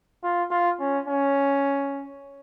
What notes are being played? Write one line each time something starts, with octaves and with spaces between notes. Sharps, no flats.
F4
F4
C#4
C#4